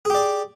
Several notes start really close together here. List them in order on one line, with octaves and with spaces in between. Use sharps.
G#4 G4 D5